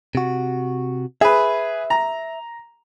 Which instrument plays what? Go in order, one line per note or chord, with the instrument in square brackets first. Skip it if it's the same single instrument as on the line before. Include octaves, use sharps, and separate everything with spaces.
[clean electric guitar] C3 F#4
[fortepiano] G#4 B4 [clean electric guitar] E5
[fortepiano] A#5